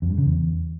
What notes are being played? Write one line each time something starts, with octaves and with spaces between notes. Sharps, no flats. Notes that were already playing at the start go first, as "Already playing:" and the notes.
F2
G2
C#3
E2